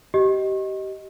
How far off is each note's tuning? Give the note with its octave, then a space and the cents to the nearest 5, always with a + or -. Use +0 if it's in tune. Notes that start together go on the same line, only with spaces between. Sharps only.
G4 -25 D#5 +5